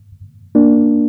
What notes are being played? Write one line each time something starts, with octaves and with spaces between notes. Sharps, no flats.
A#3 D4